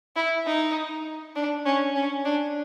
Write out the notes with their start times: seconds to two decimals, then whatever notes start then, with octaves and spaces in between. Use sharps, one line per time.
0.16 E4
0.46 D#4
1.36 D4
1.66 C#4
1.95 C#4
2.25 D4